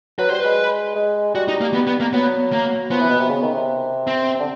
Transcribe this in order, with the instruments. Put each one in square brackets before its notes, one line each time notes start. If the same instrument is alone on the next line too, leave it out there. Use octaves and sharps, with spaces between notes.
[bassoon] F#3 [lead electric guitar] B4
[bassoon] G3 [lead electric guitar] C5
[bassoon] G#3 [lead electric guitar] B4
[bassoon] G#3
[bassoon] G3 [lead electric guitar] F#4
[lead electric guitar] D#4
A#3
B3
B3
A#3
[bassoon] F#3 [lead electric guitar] B3
[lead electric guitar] A#3
[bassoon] F3 [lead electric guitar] B3
[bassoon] E3
B2
C3
C#3
D#3
C3
[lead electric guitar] C4
[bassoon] D3